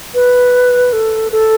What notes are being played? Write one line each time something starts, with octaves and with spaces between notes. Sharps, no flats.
B4
A4
A4